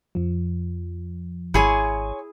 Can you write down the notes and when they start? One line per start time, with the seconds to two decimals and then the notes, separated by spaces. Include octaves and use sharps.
0.15 F2 F3
1.54 G#1 E4 G#4 C#5 G#5 C6